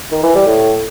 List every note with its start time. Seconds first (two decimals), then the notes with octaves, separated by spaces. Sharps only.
0.12 D#3
0.23 E3
0.35 G3
0.47 A2